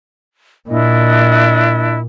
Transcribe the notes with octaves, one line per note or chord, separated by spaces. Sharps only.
A#2 D4 E4 D#5